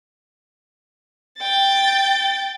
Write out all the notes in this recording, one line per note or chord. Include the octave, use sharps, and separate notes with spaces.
G5 A6